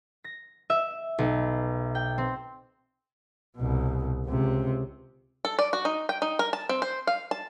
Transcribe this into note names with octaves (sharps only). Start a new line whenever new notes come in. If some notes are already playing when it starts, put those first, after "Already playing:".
A#6
E5
B1
G5
C4
C2 B2
C#2 C3
A4
D5
F#4
D#4
G5
D#4
A#4
A5
C4
C5
F5
A5